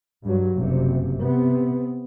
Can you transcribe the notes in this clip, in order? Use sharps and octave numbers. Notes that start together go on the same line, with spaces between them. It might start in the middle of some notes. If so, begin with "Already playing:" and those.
G2 F#3
F#1 C3
C3 B3